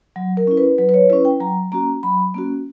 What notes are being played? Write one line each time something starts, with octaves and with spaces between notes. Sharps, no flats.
F#3
A#4
C#4 E4
B4
F#3 B4
B4
C#5
C#4 E4 B4
G5
F#3 A#5
A#3 C#4 F#4 A#5
F#3 B5
A#3 C#4 F#4